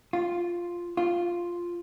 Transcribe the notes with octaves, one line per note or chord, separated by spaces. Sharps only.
F4
F4